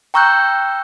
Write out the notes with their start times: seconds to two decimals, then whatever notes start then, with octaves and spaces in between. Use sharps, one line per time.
0.14 G5 A#5 C#6 E6 F#6 G6